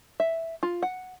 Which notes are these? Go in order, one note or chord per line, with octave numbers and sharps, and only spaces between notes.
E5
F4
F#5